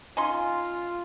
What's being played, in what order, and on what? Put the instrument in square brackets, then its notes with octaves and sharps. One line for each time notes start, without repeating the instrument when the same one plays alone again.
[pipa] C#4 D#4 C6 [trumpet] F4